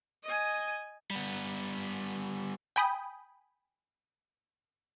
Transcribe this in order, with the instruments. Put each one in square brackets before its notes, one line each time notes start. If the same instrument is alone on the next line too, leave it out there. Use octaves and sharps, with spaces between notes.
[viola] D#5 G#5
[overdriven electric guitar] G3 B3
[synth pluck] G5 G#5 B5 D#6 G6